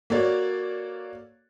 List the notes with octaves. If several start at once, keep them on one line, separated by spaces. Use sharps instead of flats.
A#3 F#4 A4 C#5 D5